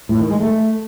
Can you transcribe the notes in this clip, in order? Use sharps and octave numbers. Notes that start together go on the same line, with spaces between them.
A2
D#3
G#3
A3